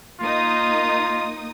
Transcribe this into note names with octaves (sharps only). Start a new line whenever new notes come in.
A#3 D#4 F4 D#6